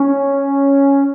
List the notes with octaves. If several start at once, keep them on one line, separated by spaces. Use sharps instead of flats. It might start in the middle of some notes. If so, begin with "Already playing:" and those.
Already playing: C#4